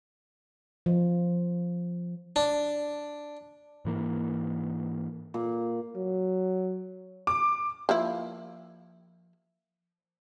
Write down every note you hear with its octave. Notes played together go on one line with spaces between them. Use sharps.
F3
D4
G#2 E3 A#3
A#2
F#3
D6
F3 A#3 E4